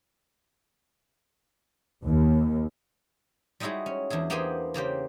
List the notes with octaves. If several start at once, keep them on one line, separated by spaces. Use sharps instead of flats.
D#2
G3 G#3 D#4 E4 F#4 G#4
C#4
E2 D4 E4 G#4
A#3 B3 G4 G#4 C5 G#5
C#3 A#3 G4 C5